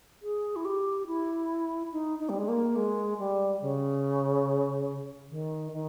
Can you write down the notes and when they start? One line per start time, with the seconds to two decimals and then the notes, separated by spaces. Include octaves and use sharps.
0.22 G#4
0.55 E4
0.65 G4
1.06 E4
1.92 D#4
2.19 D#4
2.29 G3
2.38 G#3
2.48 A#3
2.75 G#3
3.18 G3
3.61 C#3
5.29 D#3
5.72 D#3